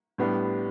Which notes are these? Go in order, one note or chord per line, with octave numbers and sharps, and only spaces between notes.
A2 G3 B3 D4 G4